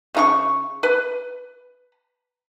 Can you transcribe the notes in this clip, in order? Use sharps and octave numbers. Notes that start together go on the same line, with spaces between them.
C#3 F4 C#6
B4